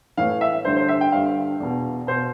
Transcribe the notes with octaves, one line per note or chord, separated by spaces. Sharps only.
A2 E3 F5
E5
G2 D3 C5
C5
E5
G5
G2 D3 F5
E2 B2
B2 C5